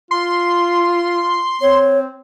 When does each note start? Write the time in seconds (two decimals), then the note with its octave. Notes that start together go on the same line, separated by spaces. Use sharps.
0.11 F4 C6
1.61 C4 C#5